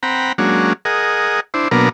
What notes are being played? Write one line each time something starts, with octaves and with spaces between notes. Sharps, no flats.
C4 F#5 G5 A#5 B5
F#3 G#3 A#3 C#4 D4 F#4
G#4 A#4 D#5 F#5
D4 E4 C5
B2 F#3 A#3 B3 D4 A#4